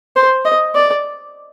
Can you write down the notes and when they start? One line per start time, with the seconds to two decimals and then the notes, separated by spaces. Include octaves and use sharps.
0.16 C5
0.45 D#5
0.75 D5